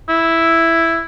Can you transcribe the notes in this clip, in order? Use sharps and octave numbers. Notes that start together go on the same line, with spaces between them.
E4